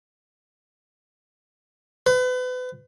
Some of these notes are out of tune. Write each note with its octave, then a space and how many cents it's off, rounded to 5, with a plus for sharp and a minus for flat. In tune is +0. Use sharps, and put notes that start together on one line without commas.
B4 +35